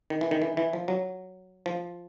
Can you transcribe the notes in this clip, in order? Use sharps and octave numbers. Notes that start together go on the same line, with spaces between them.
D#3
E3
D#3
E3
E3
F3
F#3
F3